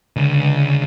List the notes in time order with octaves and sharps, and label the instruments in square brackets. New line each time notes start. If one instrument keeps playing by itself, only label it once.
[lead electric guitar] C#2 [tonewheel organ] D3